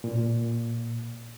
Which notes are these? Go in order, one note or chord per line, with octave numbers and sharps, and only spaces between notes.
A#2